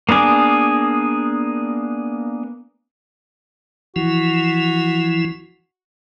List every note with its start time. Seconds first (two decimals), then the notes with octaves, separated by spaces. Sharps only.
0.09 A#3 B3 D4 G#4 D6
3.96 E3 F3 E4 F#4